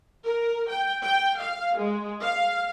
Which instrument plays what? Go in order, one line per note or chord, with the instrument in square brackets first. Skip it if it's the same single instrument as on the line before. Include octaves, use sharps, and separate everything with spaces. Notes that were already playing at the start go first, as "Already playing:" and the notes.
[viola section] A#4
G5
G5
F5
G#3
F5